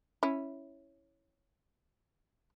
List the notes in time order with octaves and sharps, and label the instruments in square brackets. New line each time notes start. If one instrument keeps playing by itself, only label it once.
[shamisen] C#4 E4